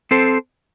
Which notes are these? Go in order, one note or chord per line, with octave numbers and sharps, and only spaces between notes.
C4 A4 C5